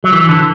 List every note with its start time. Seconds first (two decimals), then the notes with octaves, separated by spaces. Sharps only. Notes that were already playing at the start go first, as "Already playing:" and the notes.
0.04 F#3
0.12 E3
0.29 D3